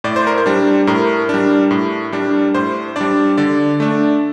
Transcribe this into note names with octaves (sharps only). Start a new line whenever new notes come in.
A2 D5
C5
A#4
C5
G3 D4
A2 A#4
G3 D4
A2
G3 D4
A2 C5
G3 D4 D5
D3 D5
A3 D4